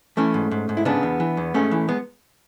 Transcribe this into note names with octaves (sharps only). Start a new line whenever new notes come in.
E3 A3 C#4
G#2
G#2
G#2
E4
C#3 B3 D4
E2
E3
E2
G#2 A3 C#4
E3
G#3 B3